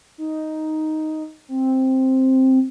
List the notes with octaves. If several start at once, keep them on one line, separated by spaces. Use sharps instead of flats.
D#4
C4